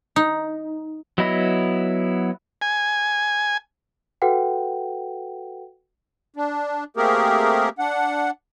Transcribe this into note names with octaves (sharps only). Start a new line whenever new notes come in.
D#4
F#3 B3 E4 D#5 B5
G#5
F#4 A4 B4 F#5 G5
D4
A3 A#3 C4 G4 G#4 A#4
D4 F#5